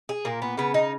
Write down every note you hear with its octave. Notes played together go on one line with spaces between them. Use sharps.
G#4
A#2 A#3
B3
C#3 B3
D#4